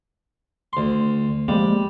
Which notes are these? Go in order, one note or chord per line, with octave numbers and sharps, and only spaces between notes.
D2 C6
F3 G3 G#3 A#3